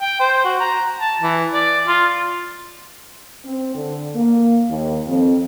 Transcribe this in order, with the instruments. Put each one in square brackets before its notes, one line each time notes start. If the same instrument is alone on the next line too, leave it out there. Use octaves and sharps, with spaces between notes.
[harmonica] G5
C5
F#4
A#5
A5
E3
D5
F4
[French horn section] C4
D3
A#3
D#2
F2